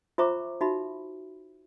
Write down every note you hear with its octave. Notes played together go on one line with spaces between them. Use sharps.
F4 C5 E5 A#5 C#6 D6
D#4 F#4 E5 B5